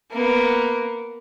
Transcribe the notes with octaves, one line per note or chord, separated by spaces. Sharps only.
A#3 B3